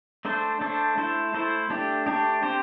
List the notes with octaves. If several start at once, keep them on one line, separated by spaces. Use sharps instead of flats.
A3 D4 A4 C5
A3 D4 A4 C5
A3 E4 A4 C5
A3 E4 A4 C5
A3 D4 G4
A3 D4 G4
C4 G4 C5